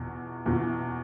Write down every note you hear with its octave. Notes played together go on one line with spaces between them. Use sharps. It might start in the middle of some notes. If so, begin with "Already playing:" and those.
Already playing: E2 B2
E2 B2